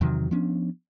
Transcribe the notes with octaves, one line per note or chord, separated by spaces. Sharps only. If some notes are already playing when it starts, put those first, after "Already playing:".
E2 C3 D#3 F#3
F3 B3 C#4 D4